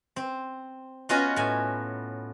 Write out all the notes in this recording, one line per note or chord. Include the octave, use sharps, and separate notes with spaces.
C4
B3 C#4 F4 F#4 D#5 G#5
A2 G#5